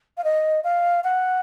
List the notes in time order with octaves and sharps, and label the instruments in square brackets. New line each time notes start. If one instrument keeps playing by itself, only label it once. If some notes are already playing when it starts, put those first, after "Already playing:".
[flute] F5
D#5
F5
F#5